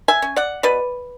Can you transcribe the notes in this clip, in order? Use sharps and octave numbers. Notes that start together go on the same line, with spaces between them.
E5 G#5
C#4
D5 F#5
B2 B4 D5